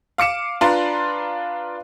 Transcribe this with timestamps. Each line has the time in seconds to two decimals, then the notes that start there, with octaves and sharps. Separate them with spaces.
0.18 F5 D6 C#7 E7
0.61 D4 F4 B4 D5 A#5 C6